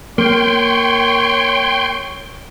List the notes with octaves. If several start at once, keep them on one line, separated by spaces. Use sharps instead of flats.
A#3 C#5 G5 C6